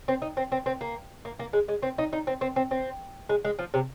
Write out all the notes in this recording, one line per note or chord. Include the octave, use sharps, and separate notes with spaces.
C4
D#4
C4
C4
C4
A#3
A#3
A#3
G#3
G#3
C4
D#4
D#4
C4
C4
C4
C4
G#3
G#3
F3
C3